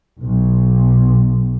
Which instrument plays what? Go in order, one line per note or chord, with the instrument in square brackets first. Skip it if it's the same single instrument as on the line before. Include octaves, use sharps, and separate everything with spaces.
[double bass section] B1